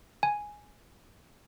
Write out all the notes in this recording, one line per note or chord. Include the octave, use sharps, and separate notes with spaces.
G#5